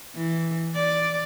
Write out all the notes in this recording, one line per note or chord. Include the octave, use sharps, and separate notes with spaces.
E3
D5